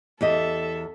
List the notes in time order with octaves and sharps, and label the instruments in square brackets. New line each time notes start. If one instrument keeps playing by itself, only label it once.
[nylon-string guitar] E2 G4 D#5 [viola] A4 E5